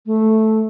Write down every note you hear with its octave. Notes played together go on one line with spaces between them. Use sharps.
A3